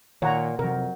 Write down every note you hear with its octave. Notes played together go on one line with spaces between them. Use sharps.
A#2 D#3 C#5 F#5 A#5
F2 C3 F#3 A#4 G6